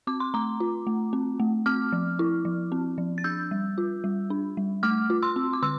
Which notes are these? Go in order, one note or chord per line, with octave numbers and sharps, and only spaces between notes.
C4 D6
C6
A3 A#5 D6
F4
A3
C4
A3
C4 D6 F6
F3
E4
F3
C4
F3
A6
D4 E6 G6
G3
F4
G3
D4
G3
A3 D6 F6
F4
C6 E6
C4
D6
D3 C6 E6